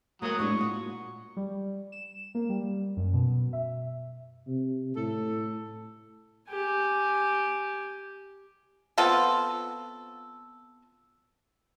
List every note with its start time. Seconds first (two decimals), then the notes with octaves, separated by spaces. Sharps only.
0.22 F#3 A3 A#3 D#6
0.39 A2 G#3 D4 C#6
0.58 A#2 F#4
1.37 G3
1.92 E7
2.35 A#3
2.49 G3
2.97 F#2
3.13 B2
3.53 E5
4.47 C3
4.96 A2 A4
6.50 G4 G#5
8.98 B3 C4 F4 A4